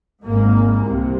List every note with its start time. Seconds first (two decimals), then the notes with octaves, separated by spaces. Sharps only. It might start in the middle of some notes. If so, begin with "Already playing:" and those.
0.24 G#1 G#2 A#3
0.83 C2 C3